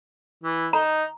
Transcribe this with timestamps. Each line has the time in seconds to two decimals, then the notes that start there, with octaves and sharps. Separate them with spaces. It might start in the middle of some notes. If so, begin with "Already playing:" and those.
0.44 E3
0.73 D#4 A#5